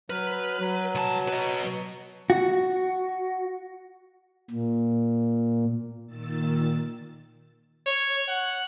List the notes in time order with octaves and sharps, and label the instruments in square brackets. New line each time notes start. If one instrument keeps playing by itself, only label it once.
[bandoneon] F#3 F6 [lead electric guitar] B4
[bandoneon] F#3
[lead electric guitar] C2 A5
B4 D#5
[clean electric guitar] F#4
[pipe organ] A#2
[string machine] A#2 D#3 E6 A6
[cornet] C#5
F#5